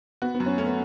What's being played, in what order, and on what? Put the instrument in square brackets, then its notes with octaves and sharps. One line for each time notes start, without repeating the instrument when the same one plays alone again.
[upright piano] B3 [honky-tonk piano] F#4
[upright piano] B3
[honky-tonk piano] F#2
[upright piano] C#4
[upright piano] A3 [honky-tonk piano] C#4
[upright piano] B3